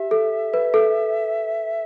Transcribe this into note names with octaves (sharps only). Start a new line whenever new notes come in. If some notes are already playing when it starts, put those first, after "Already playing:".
Already playing: G4 E5
A4
B4
A4